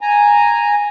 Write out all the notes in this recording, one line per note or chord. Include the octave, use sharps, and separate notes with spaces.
G#5 A#5